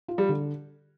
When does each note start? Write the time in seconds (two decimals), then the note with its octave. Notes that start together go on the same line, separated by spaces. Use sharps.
0.08 F4
0.18 G3
0.29 D3